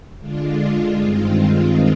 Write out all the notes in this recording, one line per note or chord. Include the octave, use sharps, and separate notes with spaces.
D3 G#3 D4 F4
G2 D#3 G#3 C4 F4